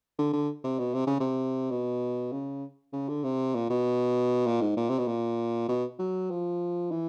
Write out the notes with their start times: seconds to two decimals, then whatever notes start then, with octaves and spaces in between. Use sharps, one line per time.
0.19 D3
0.33 D3
0.64 C3
0.79 B2
0.94 C3
1.07 C#3
1.20 C3
1.71 B2
2.32 C#3
2.93 C#3
3.09 D3
3.24 C3
3.55 A#2
3.70 B2
4.47 A#2
4.61 G#2
4.77 A#2
4.90 C3
4.99 B2
5.07 A#2
5.69 B2
5.99 F#3
6.31 F3
6.91 E3